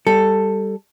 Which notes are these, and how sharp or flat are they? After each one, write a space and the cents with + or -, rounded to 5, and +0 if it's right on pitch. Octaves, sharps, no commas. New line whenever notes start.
G3 +0 A4 +10